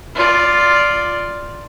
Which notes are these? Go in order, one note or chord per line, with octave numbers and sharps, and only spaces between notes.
F4 D5